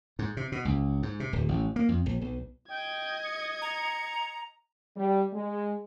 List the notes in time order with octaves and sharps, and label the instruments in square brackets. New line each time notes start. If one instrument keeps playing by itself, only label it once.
[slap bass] G#2
C3
B2
C#2
G#2
C3
D1
A1
A#3
F2
A#1
B1
[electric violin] D#5 G#6 [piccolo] G5
[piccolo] C#7
[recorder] A#5
[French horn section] G3
G#3